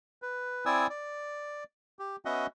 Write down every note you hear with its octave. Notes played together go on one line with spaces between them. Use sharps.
B4
C4 E4 D5 G#5 D#6 E6
D5
G4
B3 C#4 F#4 D#5 E5 F#5